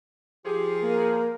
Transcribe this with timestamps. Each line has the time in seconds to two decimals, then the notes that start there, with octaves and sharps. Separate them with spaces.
0.45 F3 G4 G#4
0.82 A#3 A#4